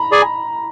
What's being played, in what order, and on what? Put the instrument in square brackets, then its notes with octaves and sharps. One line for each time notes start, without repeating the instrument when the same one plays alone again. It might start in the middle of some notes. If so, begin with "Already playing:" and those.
Already playing: [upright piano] A#5 B5
[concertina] G#4 D5 G#5